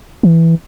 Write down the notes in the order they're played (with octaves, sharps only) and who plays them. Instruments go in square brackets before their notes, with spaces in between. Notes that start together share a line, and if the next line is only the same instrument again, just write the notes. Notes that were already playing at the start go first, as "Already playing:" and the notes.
[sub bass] E3